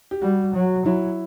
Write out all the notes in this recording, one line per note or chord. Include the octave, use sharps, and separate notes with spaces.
G4
G3 F#4
F#3
F#3 E4